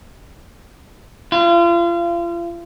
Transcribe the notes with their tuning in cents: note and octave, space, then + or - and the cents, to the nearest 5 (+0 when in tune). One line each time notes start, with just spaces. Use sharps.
F4 -35